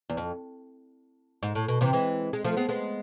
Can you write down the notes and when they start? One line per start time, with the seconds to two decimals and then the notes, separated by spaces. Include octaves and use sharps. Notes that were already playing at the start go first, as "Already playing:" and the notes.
0.09 E2
0.17 F2
1.43 G#2
1.55 A2
1.68 B2
1.81 C3 E3
1.93 E3 G#3
2.33 G#3
2.44 F3 A3
2.57 G#3 B3
2.69 G#3 B3